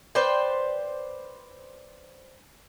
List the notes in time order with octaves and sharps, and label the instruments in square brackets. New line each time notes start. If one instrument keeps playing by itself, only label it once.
[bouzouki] B4 C5 D5 G5